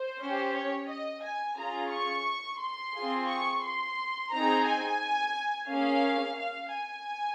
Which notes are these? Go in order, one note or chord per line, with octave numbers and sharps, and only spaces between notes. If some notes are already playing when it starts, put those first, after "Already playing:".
Already playing: C5
C#4 G4
C#5
D#5
G#5
C#4 F4 G#4 A#5
C#6
C6
C4 F4 G#4
C#6
C6
C4 D#4 G#4 A#5
G#5
A#3 C#4 G#4 F5
F5
G#5